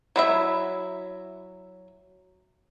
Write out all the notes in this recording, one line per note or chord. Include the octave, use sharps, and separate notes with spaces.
F#3 E4 E5